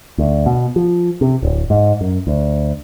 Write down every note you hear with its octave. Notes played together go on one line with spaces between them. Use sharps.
D2
B2
F3
C3
D1
G#2
F#2
D2